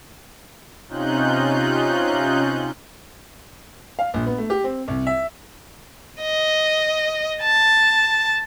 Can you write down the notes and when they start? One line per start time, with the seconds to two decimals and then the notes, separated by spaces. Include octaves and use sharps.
0.88 C3 C#4 D#4 F4 F#6 G6
3.99 F5
4.14 A#1
4.26 B3
4.38 A3
4.50 G4
4.64 C4
4.88 C2
5.07 E5
6.22 D#5
7.42 A5